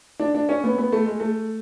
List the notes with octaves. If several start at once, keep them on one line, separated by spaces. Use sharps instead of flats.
D4
D4
C#4
B3
B3
A3
G#3
A3